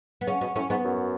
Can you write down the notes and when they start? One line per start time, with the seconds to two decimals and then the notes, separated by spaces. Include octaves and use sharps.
0.21 B3
0.27 C#3 C#4
0.41 B2 C#4
0.56 A2 C#4
0.70 G#2 B3
0.84 F#2